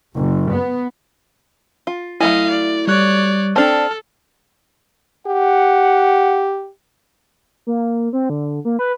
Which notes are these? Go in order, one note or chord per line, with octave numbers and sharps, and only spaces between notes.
F#1
B3
F4
F#3 A3 E4 D#5 F5 G#5
D5
G3 C#5 D5 F#6
C4 D4 A4 A5 F6
G4 F#5
A#3
C4
D3
A#3
B4